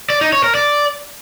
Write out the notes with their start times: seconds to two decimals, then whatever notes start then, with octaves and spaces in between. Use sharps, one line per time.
0.10 D5
0.21 D#4
0.33 C#5
0.44 A#4
0.55 D5